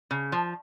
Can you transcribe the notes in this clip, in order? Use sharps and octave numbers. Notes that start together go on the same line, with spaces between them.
C#3
F3